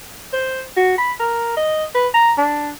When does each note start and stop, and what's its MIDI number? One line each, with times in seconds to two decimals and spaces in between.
0.33 0.62 72
0.77 0.95 66
0.98 1.12 83
1.20 1.56 70
1.57 1.84 75
1.95 2.07 71
2.14 2.32 82
2.38 2.69 62